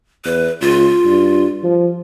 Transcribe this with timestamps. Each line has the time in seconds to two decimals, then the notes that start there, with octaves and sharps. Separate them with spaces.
0.25 E2 B4
0.61 C#2 F4
1.05 G2
1.64 F3